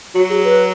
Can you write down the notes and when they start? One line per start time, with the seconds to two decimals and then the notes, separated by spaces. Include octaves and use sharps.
0.14 F#3 F#4
0.30 G#4
0.45 B4